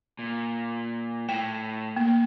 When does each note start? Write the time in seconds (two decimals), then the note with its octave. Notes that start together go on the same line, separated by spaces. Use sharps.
0.19 A#2
1.29 A2 G5
1.96 A#3